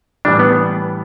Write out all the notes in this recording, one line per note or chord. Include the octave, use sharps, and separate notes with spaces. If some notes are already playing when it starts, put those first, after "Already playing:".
A2 E3 G3 D4
B3